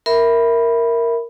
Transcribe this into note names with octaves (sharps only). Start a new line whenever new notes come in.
A#4 E5 B5